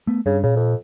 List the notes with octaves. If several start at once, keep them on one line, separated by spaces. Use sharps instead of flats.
A3 B3
G2 C#3
A#2 C#3
F2